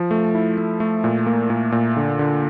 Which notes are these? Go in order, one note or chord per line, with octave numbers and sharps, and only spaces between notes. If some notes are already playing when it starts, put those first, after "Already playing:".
Already playing: F3
A3
E4
A3
A3
A#2
A#3
A#2
A#2
D3
D3